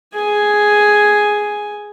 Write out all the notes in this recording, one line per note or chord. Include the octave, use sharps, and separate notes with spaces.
G#4 G#5